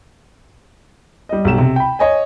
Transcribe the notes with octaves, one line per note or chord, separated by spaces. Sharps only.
G3 D#5
B1 G4 E7
C3
G5 B5
C#5 D#5 G#5